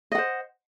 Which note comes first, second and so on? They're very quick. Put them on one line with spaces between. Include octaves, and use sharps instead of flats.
D#5 F#5 C5